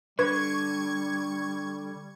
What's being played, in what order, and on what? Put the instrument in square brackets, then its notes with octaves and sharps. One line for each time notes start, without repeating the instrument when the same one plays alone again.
[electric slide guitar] D3 [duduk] G3 [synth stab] B4 [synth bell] C#6 G#6